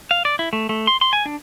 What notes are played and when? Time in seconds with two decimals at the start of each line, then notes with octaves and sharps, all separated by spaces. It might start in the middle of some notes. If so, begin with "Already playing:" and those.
0.11 F5
0.25 D5
0.39 E4
0.53 A3
0.69 A3
0.87 C6
1.01 C6
1.13 G#5
1.26 D4